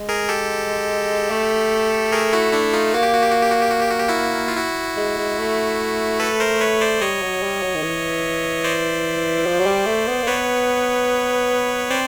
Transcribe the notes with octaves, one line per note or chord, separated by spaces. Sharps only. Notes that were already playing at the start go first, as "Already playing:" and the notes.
Already playing: G#3
G#4 A#4
G4 A4
A3
G#4 A#4
E4 F#4
D4 E4
D#4 F4
A#3 F#4
G4
F#4
G4
F#4
G4
F#4
G4
F#4
G4
F#4
G4
E4 F#4
F4
E4 F#4
G#3
G#3
A3
A4 B4
A#4 C5
B4 C#5
C5 D5
G3 C#5 D#5
F#3
G3
F#3
D#3
E3
C5 D5
F3
F#3
G3
A3
B3
A#3
B3 B4 C#5
C4 C5 D5